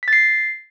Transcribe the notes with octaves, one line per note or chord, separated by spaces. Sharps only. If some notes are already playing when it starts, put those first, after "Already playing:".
A6 B6 C7